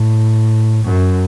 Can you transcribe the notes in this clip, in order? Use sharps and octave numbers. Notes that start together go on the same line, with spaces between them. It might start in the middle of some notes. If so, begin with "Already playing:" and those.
Already playing: A2
F#2